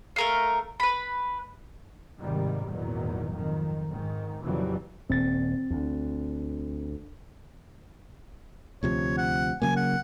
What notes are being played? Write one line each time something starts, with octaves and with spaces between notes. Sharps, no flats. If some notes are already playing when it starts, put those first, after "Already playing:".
A3 A#4 F5
B4 B5
G#1 G#2 C3 D#3 G3
G#1 E2 A#2 D#3 F#3
F2 D#3
G#2 D#3
F2 A#2 C#3 E3 F#3 G3
D#1 C4 A6
D2
D2 C3 F3 C#5
F#5
C#3 F#3 A#3 G#5
F#5